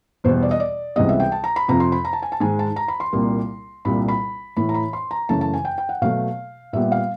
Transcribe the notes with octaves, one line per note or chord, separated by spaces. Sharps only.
E2 B2 G3 B3 C5
D5
D#5
D5
C#2 C3 E3 G3 B3 D#5
E5
G5
A5
A#5
B5
F2 C3 F3 A#5
C6
B5
A#5
A5
G#5
A5
G#2 D#3 G#3 G#5
A5
A#5
B5
C6
C2 A#2 G3 A#3
C2 A#2 G3 B5
B5
A2 E3 A3 B5
A#5
B5
C6
A#5
F#2 C#3 E3 A3 A5
A5
G#5
G5
G5
F#5
B2 F#3 A3 F5
A#2 G3 B3 E5
F5